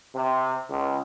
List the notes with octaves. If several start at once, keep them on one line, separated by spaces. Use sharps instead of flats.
C3
C#2